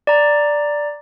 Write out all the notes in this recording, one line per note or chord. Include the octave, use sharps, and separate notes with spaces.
D5 A#5